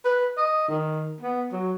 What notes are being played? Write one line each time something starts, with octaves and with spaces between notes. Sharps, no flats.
B4
D#5
D#3
B3
F#3